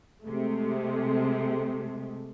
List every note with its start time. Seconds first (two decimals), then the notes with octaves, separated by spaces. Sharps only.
0.22 C3 G#3 A3